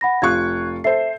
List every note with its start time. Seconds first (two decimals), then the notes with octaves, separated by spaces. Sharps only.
0.01 F#5 B5 A#6
0.22 F1 F4 C#6 F#6 G#6
0.84 A4 C5 E5 C7